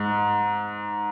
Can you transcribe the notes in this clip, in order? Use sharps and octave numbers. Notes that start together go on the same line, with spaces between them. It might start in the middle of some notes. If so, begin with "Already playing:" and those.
Already playing: G#2